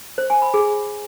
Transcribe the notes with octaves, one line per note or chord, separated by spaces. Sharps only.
C5
G#5
B5
G#4